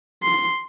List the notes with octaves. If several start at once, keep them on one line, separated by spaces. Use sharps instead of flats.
C6